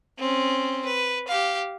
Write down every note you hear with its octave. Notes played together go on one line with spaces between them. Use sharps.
C4 C#4
B4
G4 F5